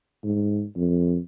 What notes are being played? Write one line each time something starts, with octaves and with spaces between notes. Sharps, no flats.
G#2
F2